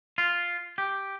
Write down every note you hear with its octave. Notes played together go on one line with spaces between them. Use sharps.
F4
G4